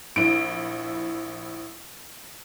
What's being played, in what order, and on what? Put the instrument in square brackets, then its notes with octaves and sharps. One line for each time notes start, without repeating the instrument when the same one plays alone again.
[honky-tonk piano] A#1 E4 D7